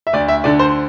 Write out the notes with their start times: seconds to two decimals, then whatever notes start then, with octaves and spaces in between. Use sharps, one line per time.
0.07 E5
0.13 D2 D5
0.28 E5
0.44 D3 D5
0.59 C5